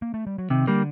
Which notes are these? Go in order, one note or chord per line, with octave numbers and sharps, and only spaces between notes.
A#3
A3
G3
F#3
C3 D#3
D3 G3 A#3